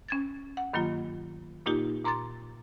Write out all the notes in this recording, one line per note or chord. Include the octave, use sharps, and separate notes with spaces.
C#4 G#6 A6
F#5
G2 D#3 F#3 A#3 F4
A#2 A#3 D#4 F4 G4
A#2 A#5 C6 D6 A6